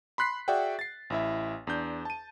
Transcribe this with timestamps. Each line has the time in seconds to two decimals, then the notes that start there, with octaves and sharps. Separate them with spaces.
0.18 B5 C6 F#6 B6 C7
0.48 F#4 G#4 D5 E5 F#5 G5
0.79 A6 C7
1.10 A1 E4 E5
1.67 E2 D4 G6
2.05 A5 D#7